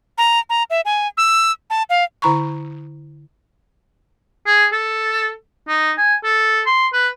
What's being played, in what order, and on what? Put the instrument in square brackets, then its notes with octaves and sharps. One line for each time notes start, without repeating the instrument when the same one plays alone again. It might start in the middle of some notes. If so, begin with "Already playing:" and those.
[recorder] A#5
A#5
E5
G#5
E6
A5
F5
[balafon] D3 E4 A#5 B5 C#6
[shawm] G#4
A4
D#4
G#5
A4
C6
B4